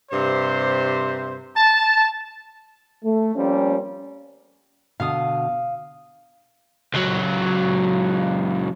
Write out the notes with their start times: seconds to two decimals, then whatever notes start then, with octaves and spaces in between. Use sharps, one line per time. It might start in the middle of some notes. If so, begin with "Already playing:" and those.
0.11 G2 C3 C5
1.56 A5
3.04 A3
3.35 F3 G3 A#3 C4 C#4
5.00 B2 D3 F5 D#6
6.94 C#2 F#3